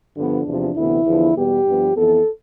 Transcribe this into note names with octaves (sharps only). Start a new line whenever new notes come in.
G2 D3 F3 B3 D4
E2 C3 F3
D2 C3 E3 B3 E4
E2 D3 F3 B3
E2 B2 G3 B3 G4
G2 F3 B3
F2 E3 B3 A4